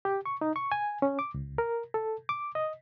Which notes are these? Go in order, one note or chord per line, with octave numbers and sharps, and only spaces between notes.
G4
C#6
D#4
C#6
G#5
C#4
D6
C#2
A#4
A4
D6
D#5